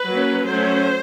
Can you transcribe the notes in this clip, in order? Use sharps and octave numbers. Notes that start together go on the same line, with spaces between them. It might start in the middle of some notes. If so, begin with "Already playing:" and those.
Already playing: B4
F#3 A#3 C#4
F#3 A3 C#4 C5